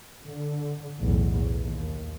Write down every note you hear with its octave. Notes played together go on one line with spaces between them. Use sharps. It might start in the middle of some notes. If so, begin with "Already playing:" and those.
D3
B1 E2 A2
D#2